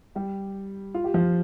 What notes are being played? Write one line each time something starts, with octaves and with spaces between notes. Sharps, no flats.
G3 G4
F4
G4
F3 F4